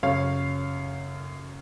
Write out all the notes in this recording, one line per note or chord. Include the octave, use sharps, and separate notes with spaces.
F#2 C#3 C#5 F5